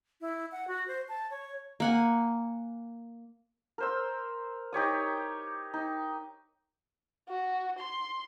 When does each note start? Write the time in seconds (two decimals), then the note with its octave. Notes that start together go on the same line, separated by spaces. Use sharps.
0.21 E4
0.52 F#5
0.68 F#4
0.88 C5
1.09 A5
1.31 C#5
1.80 A#3 F#5 G#5
3.78 A#4 C5 E6
4.73 D#4 G4 C#5 D#6
5.74 D#4
7.29 F#4
7.79 C6